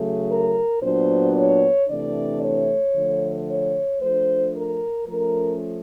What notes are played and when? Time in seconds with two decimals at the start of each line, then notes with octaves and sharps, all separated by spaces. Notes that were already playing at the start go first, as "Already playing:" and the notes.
Already playing: C#3 F#3 A3
0.30 A#4
0.82 A#2 F#3 B3 D4 C5
1.36 C#5
1.88 C3 E3 A3 D4 D5
2.42 C#5
2.95 D3 F3 A3
3.48 C#5
4.00 F3 A3 D4 C5
4.55 A#4
5.07 F3 A3 C#4 A#4